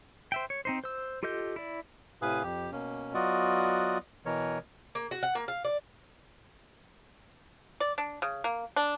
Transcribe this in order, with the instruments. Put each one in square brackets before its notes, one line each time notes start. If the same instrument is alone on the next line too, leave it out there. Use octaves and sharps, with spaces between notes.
[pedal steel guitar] C5 E5 G5
C#5
C4 D#4 C5
C5 E6
F4 G4 A4 D#5 G6
E4 D5
[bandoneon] A2 C3 B4 F5 G#5 D#6
F2 G4
B2 A#3 C#4
F#3 B3 F4 F#4 D5 D#5
B2 E3 A#4 C#5
[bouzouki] A#3
F#4
F#5
A#3
F5
D5
[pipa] D5
D4
C#3
A#3
D4